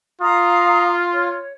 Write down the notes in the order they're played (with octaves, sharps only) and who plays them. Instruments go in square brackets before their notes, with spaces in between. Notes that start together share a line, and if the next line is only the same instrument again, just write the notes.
[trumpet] F4 [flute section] F5 A#5 D#6
[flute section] C#5